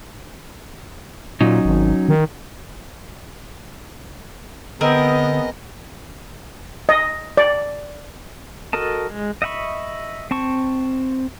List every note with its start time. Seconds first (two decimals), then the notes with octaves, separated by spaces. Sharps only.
1.41 A#2 F#3 C#4 D#4
1.65 G#1
2.09 D#3
4.81 D3 B3 C4 G#4 A#4 D#5
6.89 D#5
7.37 D5
8.73 F#4 A4 A#4 D#5 A5
9.10 G#3
9.42 D#5 E5 F#5 B5 C#6
10.31 C4 A5 C#6